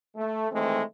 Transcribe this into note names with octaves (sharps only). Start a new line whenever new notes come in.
A3
D#3 E3 G#3 A3 C4